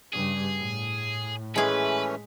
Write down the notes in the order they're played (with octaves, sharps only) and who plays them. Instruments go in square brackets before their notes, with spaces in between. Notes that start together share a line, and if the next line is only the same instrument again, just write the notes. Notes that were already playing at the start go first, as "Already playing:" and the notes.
[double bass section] G2 C#3 G3 [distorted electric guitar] G#4
[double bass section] A2
[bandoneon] E3 A3 C#4 [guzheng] G#3 G#4 [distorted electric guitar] B4